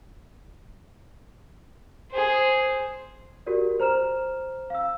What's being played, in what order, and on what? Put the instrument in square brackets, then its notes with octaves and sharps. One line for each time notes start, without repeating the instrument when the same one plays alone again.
[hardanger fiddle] G#4 C5
[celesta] F#4 G4 A#4 D5
C5 A#5 F6 E7
F5 E6